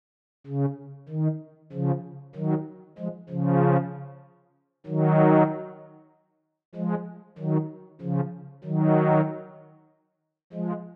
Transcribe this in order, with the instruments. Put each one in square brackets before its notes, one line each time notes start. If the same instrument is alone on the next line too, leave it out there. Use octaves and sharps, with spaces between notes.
[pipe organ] C#3
D#3
C#3 F3
D#3 F#3
F3 G#3
C#3 F3
D#3 F#3
F3 G#3
D#3 F#3
C#3 F3
D#3 F#3
F3 G#3